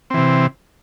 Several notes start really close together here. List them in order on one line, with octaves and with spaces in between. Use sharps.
C4 E3 C3